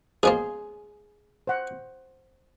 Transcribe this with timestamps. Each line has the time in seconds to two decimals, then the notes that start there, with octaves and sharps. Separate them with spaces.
0.23 B2 F3 A#3 G#4 C6
1.47 C5 F#5